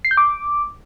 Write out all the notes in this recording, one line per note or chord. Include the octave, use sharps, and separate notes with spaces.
C7
G6
D6